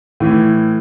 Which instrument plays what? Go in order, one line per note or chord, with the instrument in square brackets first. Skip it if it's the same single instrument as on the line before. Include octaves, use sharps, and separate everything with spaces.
[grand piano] A2 E3